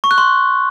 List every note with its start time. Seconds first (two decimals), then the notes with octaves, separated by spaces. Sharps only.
0.04 C#6
0.11 F#6
0.18 C6